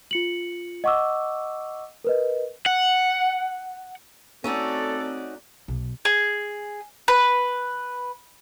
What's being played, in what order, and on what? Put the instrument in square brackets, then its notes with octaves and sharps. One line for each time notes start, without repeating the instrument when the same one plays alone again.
[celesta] F4 C#7 F#7
D#5 F#5 C#6 D6 E6
A#4 B4 D#5
[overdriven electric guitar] F#5
[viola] A3 D5 [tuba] C4 [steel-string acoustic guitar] C#4 D#4 F#4 [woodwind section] A4
[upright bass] B1
[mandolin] G#4
B4